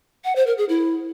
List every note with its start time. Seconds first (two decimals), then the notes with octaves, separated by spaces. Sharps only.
0.25 F#5
0.36 C5
0.47 A#4
0.58 G#4
0.69 E4